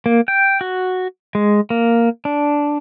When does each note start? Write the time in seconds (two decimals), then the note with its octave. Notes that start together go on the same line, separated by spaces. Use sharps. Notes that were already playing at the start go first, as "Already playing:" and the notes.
0.06 A#3
0.28 G5
0.61 F#4
1.35 G#3
1.70 A#3
2.25 D4